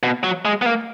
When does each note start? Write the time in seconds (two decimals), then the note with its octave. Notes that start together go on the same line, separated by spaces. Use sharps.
0.03 B2
0.24 F#3
0.45 G#3
0.62 B3
0.66 A#3